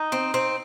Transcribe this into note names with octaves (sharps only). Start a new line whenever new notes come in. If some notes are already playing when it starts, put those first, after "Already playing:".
Already playing: D#4
C4
C4